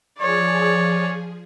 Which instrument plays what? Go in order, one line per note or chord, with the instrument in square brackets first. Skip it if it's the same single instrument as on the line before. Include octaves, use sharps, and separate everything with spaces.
[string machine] F3 G#4 [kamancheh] C#5 D5